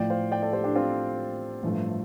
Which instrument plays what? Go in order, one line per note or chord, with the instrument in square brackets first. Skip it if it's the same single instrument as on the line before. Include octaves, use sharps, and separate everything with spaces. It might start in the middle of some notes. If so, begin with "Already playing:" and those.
Already playing: [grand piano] A1 A2 F3 A3 D5 G5
C5 F5
D5 G5
A4 D5
G4 C5
D4 G4
C4 F4
A1 G2 F3 A3